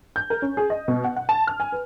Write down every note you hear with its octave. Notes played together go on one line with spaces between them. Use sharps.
G6
A#4
C#4
G#4
D#5
B2
F#5
F#5
A5
F6
G#5
B4